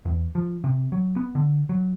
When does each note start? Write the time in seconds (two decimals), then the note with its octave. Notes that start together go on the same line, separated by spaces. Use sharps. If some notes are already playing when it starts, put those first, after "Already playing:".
0.05 E2
0.35 F3
0.64 C3
0.92 F#3
1.16 B3
1.35 D3
1.69 F#3